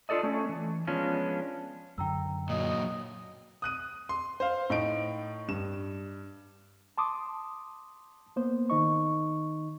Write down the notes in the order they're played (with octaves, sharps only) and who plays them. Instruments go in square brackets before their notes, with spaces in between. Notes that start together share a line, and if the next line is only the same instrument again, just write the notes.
[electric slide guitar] D4 F4 F#4 A4 D5 D#5
A3 C#4
E3
F3 G#3 B3 C#4 D4 F4
[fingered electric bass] F#2 D3 [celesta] G5 A#5 E6
[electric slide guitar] A#2 F#3 [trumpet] D#5
[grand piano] D#6 F#6 D#7
C6
C5 F5
A2 D#4 D7
G2 E7
[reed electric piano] A5 C6 D6 D#6
A#3 B3 C5
D#3 D#4 D#5 C#6